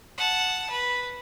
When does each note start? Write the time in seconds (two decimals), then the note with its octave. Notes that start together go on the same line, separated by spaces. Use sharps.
0.18 F#5 A5
0.70 B4